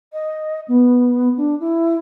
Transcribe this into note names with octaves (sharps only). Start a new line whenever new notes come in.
D#5
B3
D4
E4